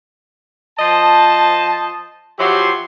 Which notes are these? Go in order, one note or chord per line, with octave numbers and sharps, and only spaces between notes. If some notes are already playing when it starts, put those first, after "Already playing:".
F3 C5 D#5 A5
F3 F#3 E4 F#4 G4 C6